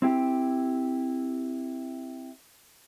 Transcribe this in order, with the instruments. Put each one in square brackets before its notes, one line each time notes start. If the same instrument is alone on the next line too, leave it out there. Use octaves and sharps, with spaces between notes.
[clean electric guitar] C4 E4 G4